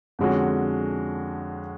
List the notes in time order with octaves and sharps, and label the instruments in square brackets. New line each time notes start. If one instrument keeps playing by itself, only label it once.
[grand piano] F2 D3 G#3 C#4 F#4